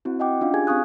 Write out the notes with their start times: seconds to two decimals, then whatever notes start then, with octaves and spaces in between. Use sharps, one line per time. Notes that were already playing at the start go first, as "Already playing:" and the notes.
0.05 C4 E4 F#4
0.20 D#5 F#5 G5 D6
0.41 C#4 D4 F4 F5
0.54 G4 G#4 G#5 G#6
0.67 C4 F5 C#6 D#6 F#6